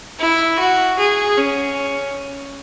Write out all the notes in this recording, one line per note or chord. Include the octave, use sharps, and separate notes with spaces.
E4
F#4
G#4
C#4